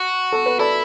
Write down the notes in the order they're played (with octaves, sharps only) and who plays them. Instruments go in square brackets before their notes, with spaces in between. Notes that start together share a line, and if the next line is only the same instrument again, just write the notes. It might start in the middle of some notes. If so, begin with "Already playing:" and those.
Already playing: [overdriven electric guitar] F#4
[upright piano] A4
B4
[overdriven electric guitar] E4 [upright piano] A4 D5